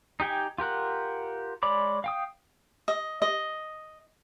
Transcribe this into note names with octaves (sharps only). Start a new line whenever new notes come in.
D#4 G4 G5 G#5
F4 G4 A#4 F#5
G#3 C#5 D5 B5 D6
F5 G5 D#6
D#5
D#5